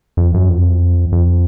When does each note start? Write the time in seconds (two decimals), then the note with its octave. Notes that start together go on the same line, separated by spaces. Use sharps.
0.17 F2
0.34 F#2
0.49 F2
1.12 F2